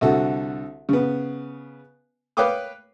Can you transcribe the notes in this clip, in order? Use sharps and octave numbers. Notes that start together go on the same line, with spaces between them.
C2 D3 F#4 A4
C#3 B3
B4 C#5 F5 G5 D6 D#6